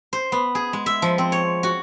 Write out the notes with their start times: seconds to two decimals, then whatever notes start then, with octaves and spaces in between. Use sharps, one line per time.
0.13 C5
0.32 B3
0.55 G#4
0.73 G#3
0.86 E5
1.02 F3
1.18 C4
1.32 C#5
1.63 F#4